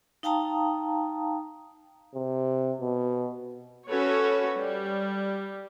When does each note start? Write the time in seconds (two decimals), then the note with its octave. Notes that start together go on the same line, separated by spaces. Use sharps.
0.23 D#4 F5 G5 A5 A#5 D#6
2.15 C3
2.81 B2
3.88 C#4 F#4 A4 B4 C#5
4.57 G3